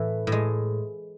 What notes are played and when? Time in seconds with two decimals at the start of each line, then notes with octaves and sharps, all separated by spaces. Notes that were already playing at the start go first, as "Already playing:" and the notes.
Already playing: A2 E3 A3
0.27 A2
0.32 G#3